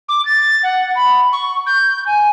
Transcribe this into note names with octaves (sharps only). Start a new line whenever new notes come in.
D6
A6
F#5
B5
C#6
G6
G#5